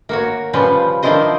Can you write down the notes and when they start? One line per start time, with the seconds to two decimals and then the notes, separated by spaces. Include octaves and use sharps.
0.09 A#3 F#4 C#5
0.53 C#3 F3 G3 B4
1.02 D#3 F3 D4 E4 C5 D#5